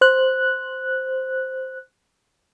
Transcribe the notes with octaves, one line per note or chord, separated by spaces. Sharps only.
C5 F#6